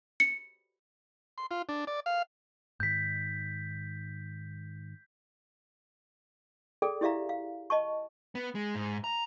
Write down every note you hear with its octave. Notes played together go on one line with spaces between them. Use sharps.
C#7
C6
F4
D4
D5
F5
G#2 D#3 G6 B6
G#4 A4 D5 G5
E4 G4 D5 E5 F5 A#5
F5
D#5 A5 C#6
B3
G#3
G#2
A#5